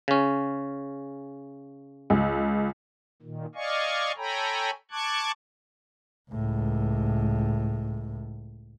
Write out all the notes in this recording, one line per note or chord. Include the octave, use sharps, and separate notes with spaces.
C#3 C#4
C#2
A#2 D#3
D5 D#5 F5 G#5 C#6
A4 C#5 G5 G#5 A#5 B5
A5 C#6 D6 F#6 G#6
C#2 A2